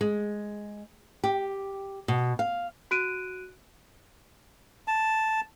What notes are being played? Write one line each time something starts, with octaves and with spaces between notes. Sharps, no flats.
G#3
G4
B2
F5
F#4 F#6 D7 D#7
A5